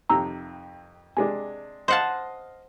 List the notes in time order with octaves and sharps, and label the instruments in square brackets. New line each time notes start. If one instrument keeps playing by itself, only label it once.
[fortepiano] F2 C3 D#3 [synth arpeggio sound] A#5 E6
[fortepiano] C3 G#3 D4 [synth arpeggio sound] G#5
[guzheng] C5 F#5 A5 [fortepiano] D#5 F5 [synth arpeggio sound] C6